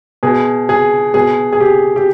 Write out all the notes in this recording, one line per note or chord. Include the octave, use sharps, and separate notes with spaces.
B2 G#4
G#4
B2 G#4
G#4
G4
G4